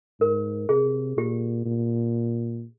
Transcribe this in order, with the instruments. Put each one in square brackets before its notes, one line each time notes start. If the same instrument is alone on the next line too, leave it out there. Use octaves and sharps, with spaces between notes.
[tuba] G#2 [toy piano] A#4
[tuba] C3 [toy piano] G#4
[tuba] A#2 [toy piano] G4
[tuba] A#2